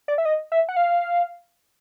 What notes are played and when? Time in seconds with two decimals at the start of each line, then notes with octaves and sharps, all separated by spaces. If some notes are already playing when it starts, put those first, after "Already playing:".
0.08 D5
0.18 E5
0.25 D#5
0.52 E5
0.69 F#5
0.76 F5